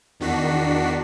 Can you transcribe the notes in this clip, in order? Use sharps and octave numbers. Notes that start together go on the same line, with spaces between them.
E2 D#3 D4 F#4 B6 C7